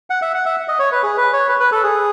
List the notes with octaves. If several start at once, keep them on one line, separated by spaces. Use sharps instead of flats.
F#5
E5
F#5
E5
D#5
C#5
B4
G#4
B4
C#5
B4
B4
A4
G#4